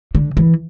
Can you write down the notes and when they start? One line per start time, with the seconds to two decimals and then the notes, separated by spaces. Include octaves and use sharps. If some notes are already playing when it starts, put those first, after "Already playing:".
0.15 D3
0.37 E3